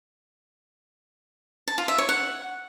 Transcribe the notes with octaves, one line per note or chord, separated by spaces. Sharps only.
A5
F4
E5
C#5
F#5